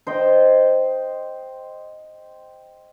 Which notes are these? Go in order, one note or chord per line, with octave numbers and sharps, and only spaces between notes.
C5 D#5 G5